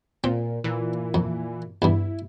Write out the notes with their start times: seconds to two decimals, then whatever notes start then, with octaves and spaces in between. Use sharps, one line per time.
0.24 A#2 C4
0.64 A#2 E3
1.14 F2
1.82 E2 G2 E4